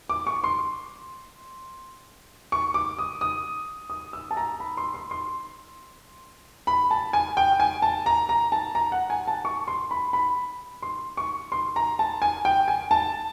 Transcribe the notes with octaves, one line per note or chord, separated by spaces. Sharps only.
D6
C#6
C6
C#6
D6
D#6
D#6
D#6
E6
A5
A#5
B5
C6
C6
C6
B5
A5
G#5
G5
G#5
A5
A#5
A#5
A5
A#5
F#5
G#5
A5
C#6
C6
B5
B5
C6
C#6
C6
A#5
A5
G#5
G5
G#5
A5